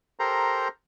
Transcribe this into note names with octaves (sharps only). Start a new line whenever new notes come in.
G4 A4 A#4 C5 A#5 C6